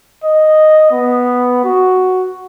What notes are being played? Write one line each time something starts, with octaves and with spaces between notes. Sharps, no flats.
D#5
B3
F#4